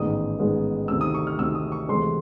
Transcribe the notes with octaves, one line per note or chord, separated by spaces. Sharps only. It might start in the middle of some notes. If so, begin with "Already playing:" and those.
Already playing: A1 G#2 D#3 G#3 B3 D#6
A1 G#2 D#3 G#3 B3
D2 C3 D#3 E6
D#6
C#6
F6
D2 C3 D#3 E6
D#6
C#6
D2 C3 E3 G#3 C6